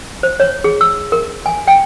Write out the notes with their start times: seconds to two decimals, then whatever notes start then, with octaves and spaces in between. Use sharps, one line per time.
0.23 C5
0.40 C#5
0.64 G#4
0.81 E6
1.12 A#4
1.46 G#5
1.68 G5